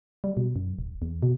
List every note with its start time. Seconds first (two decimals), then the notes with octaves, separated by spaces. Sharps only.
0.24 G3
0.37 B2
0.56 F#2
0.79 D#1
1.02 E2
1.23 B2